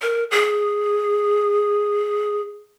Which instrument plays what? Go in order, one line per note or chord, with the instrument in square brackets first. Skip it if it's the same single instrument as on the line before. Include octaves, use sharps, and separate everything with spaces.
[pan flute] A#4
G#4